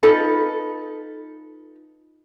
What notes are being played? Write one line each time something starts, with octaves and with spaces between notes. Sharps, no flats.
D#4 F4 A4 B4